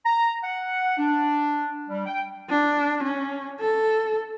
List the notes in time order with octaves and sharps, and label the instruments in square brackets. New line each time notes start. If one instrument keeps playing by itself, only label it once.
[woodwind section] A#5
F#5
D4
G3
G5
[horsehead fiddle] D4
C#4
A4